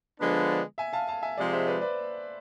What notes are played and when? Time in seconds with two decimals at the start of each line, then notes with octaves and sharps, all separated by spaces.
0.19 D3 F3 G#3 B3 D4
0.78 E5 G#5
0.93 F5 A5
1.07 F5 A5
1.22 E5 G#5
1.38 C3 F3 G#3 D5 F5
1.53 C5 E5
1.67 B4 D5
1.81 B4 D5